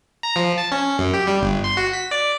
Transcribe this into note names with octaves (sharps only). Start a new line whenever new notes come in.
A#5
F3
A5
C#4
F#2
G4
G3
G1
C6
F#4
B6
D5